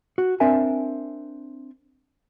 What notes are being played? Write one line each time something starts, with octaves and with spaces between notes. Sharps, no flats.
F#4
C4 D4 A#4 E5 G#5